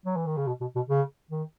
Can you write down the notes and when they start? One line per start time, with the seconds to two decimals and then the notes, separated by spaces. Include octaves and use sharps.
0.06 F#3
0.16 E3
0.26 D#3
0.37 C#3
0.47 B2
0.61 B2
0.75 B2
0.89 C#3
1.30 D#3